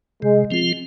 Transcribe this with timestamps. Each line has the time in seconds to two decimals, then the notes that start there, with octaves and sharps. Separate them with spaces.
0.22 C3 G#3
0.51 F3 C4 F4